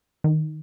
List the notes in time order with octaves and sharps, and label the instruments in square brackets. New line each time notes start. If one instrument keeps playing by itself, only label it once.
[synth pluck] D#3